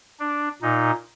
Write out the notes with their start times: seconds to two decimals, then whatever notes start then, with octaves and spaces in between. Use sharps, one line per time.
0.19 D4
0.62 A#2 D#4